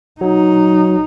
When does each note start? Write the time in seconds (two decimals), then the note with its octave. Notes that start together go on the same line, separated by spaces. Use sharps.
0.21 F#3 D#4